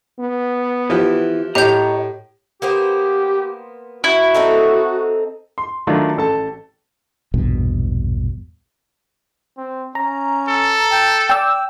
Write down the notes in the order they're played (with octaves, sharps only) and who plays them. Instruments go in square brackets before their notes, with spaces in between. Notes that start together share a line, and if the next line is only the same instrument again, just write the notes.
[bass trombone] B3
[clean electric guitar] E3 [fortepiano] F3 G4
[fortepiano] A2 [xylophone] G4 G6 [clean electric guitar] C#5 D#5 A#5
[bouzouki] A#3 B3 C5 [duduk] G4
[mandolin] E4 [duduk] F#4
[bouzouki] C4 D#4 A4
[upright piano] C6
D#3 F#3 A3 D4 F4 A4
A1 A4 A5
[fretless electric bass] A#1 E2 G2 B2
[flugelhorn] C4
[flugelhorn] C#4 [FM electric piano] A#5
[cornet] A4
[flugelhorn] G5
[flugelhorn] D5 [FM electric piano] G5 E6